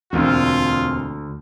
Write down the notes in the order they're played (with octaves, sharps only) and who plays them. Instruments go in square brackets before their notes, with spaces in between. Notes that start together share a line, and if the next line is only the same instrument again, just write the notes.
[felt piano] E1 A#3 C4 [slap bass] D2 [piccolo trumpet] F4